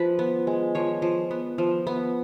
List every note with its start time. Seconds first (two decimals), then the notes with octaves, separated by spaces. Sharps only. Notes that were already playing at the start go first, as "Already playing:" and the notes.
Already playing: F3 B4
0.19 B3
0.47 G#3
0.75 F3 C#5
1.02 F3
1.31 B3
1.58 F3
1.87 B3